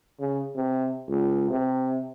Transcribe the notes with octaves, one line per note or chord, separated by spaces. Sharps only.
C#3
C3
C#2
C3